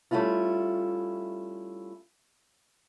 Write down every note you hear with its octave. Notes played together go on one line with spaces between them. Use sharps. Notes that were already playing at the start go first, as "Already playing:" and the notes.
G3 A3 C#4 E4 F4